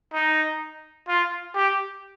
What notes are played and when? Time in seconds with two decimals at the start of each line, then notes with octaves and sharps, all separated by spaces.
0.14 D#4
1.08 F4
1.55 G4